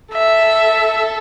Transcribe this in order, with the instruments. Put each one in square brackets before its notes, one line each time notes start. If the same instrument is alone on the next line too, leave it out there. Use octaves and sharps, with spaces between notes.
[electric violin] A4 [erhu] E5